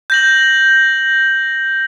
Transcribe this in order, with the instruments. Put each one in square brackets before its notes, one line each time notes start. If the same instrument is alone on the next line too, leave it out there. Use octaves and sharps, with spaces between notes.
[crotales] G6 A#6 F#7